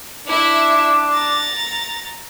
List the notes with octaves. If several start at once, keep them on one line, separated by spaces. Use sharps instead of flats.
D4 E4 E5
A#5 A6